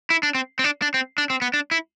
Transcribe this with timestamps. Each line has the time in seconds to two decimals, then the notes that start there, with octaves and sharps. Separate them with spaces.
0.10 E4
0.23 D4
0.35 C4
0.59 C4
0.64 D4
0.82 D4
0.94 C4
1.18 D4
1.30 C4
1.42 B3
1.54 D4
1.71 E4